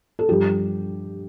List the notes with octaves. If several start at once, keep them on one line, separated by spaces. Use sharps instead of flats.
A4
G2 F3 G4